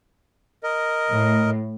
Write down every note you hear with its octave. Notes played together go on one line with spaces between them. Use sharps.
A#4 D#5
A2